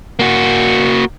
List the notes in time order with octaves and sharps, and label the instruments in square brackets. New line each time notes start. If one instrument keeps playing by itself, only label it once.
[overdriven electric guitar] A#3 F#4